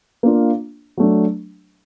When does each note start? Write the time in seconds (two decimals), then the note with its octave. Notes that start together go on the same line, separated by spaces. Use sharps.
0.23 A#3 D4 F4
0.97 F#3 A3 D4